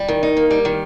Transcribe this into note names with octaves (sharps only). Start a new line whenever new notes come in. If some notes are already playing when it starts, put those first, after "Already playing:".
Already playing: G3
D#3
D#4
A#3
G3
D#3